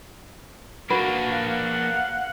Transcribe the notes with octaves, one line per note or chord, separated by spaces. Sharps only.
A#3 D4 F#4 B4
F5 F#5